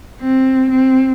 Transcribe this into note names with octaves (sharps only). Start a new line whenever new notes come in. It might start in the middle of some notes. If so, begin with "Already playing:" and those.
C4
C4